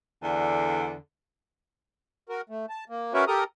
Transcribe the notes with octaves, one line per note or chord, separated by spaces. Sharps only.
E2 D3
F#4 A#4
A3
A5
A#3
C#4 F#4 A#4 B4 C#5 E5
G4 A4 A#4 A#5 D#6